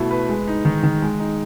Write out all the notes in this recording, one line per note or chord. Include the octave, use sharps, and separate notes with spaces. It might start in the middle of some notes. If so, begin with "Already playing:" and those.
Already playing: B2 A3 E4
B4
G#3
D#4
D#3
D#3
G#3
D#4